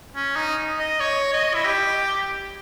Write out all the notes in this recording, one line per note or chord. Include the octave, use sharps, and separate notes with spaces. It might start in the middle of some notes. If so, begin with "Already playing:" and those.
C#4
D#4
D#5
C#5
D#5
E4
G4